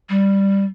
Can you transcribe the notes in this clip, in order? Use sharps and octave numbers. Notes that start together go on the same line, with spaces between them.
G3